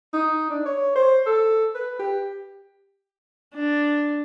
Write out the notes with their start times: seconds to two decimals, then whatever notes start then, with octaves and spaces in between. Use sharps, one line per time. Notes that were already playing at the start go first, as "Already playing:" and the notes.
0.13 D#4
0.50 D4
0.66 C#5
0.96 C5
1.27 A4
1.75 B4
1.99 G4
3.55 D4